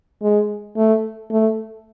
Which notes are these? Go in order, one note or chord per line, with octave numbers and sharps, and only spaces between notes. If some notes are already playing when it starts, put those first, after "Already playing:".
G#3
A3
A3